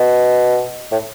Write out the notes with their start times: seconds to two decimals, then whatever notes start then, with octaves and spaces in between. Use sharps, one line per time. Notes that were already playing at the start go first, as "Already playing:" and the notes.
Already playing: B2
0.92 A2